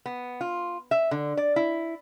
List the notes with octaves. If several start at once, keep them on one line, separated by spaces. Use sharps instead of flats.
B3
F4
E5
D3
D5
E4